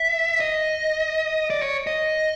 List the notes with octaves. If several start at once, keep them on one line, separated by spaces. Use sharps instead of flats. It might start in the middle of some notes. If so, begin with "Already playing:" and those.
Already playing: E5
D#5
D5
C#5
D#5